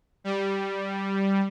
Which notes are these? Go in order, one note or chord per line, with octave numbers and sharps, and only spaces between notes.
G3